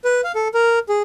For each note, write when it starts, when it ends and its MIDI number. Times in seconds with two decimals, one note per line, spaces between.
0.05 0.21 71
0.24 0.32 77
0.35 0.48 69
0.54 0.79 70
0.89 1.03 68